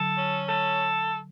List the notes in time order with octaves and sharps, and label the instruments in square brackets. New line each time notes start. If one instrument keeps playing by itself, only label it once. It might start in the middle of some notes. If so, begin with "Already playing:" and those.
Already playing: [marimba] D3 F#3 [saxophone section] A4
[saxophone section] C#4
A4